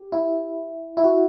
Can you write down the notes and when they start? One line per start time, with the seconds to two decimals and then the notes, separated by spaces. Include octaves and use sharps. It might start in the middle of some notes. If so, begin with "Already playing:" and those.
Already playing: G4
0.12 E4
0.97 E4
1.04 F#4